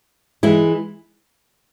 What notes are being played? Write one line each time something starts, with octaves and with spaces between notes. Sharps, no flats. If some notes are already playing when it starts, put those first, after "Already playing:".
E3 G#3 E4